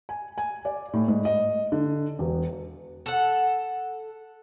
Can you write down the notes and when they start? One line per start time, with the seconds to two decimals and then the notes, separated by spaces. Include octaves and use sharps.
0.09 G#5
0.38 G#5
0.65 D5
0.93 A2
1.08 G#2
1.25 D#5
1.72 D3
2.19 E1
3.06 A4 F#5